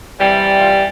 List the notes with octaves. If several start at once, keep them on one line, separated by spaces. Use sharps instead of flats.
C3 E3 G3
F4